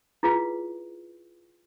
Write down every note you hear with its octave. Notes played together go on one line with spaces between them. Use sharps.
E4 F4 G#4 B4 F5